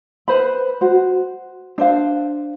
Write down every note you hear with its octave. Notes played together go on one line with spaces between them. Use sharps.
B4 C5 B5
F#4 C5
D4 C5 F5